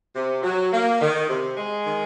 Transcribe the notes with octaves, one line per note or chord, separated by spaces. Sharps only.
C3
F#3
A#3
D#3
C3
G#3
D#3